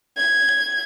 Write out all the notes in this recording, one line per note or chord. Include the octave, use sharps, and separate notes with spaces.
G#6